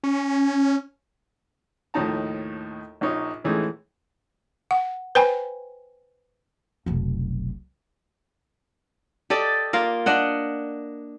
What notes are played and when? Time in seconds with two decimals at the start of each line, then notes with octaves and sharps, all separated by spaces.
0.04 C#4
1.94 D#2 A2 F3 D#4 A5 A#5
3.01 A#1 F3 D#4 C#5
3.44 A2 E3 F3 G#3 A3 D#4
4.71 F#5
5.15 B4 C5 G5 G#5 B5
6.86 F1 B1
9.30 G4 A4 D5 D#5
9.73 A#3 F4 A#4
10.06 D4 D#5 F#5